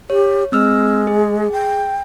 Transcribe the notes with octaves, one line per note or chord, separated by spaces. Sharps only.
G4 C#5
G#3 C4 E6 F6
G#4
G5